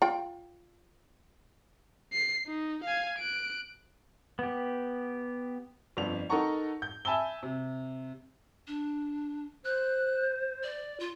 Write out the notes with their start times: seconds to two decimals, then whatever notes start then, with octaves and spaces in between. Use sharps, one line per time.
0.02 F4 G5
2.13 C7
2.46 D#4
2.84 F5 G#5
3.19 F#6 D7
4.39 B3 G4
5.97 G1 F2 D4 F7
6.30 D#4 A4 A#4 F#5 A#5 C#6
6.82 G6
7.05 E5 G#5 A5 B5 E6 G7
7.43 C3
8.67 D4
9.65 C5 F#6
10.63 D5
11.00 F4